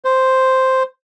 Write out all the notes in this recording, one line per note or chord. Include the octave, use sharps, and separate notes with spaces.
C5